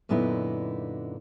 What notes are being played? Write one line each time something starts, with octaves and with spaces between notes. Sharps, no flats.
F#2 A#2 D3 B3 D#4 E4